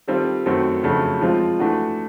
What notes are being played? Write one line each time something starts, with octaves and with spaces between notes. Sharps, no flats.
D#3 G3 C4 F4 A4
F#2 D#3 F#3 A3 C4
F2 C#3 F#3 A3 D4
F3 G#3 C4 F4
E3 A3 D4 F#4